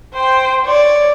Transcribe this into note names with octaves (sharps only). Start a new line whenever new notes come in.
C5 G5
C#5 D5